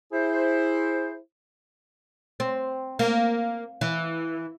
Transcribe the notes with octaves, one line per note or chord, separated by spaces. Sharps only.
E4 G#4 C5
C4
A#3
E3